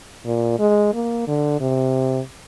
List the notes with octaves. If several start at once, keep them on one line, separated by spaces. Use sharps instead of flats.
A#2
G#3
A#3
D3
C3